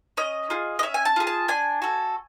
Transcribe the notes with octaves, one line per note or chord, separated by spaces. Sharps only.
C#4 D#5
F4 G#4
D#5
C#4 E5
G#5
A5
F4 G#4
A5
D4 G#5
F#4 A4